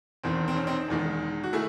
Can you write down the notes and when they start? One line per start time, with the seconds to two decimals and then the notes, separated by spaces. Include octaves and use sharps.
0.23 E1 E2 D#3 C4
0.48 C4
0.56 C#4
0.67 C4 D#4
0.88 E1 E2 D#3 G#3
1.44 F#4
1.53 D#3 A3 E4 G#4